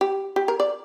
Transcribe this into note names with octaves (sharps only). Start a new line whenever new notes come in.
G4
G4
A#4
D5